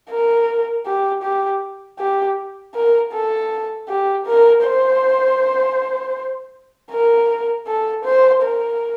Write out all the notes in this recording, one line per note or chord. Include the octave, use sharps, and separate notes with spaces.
A#4
G4
G4
G4
A#4
A4
G4
A#4
C5
A#4
A4
C5
A#4